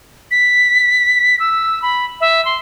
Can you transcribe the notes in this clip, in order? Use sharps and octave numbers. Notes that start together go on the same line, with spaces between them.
B6
E6
B5
E5
C6